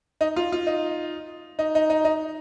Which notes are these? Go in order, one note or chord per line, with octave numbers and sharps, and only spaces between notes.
D#4
F4
F4
D#4
D#4
D#4
D#4
D#4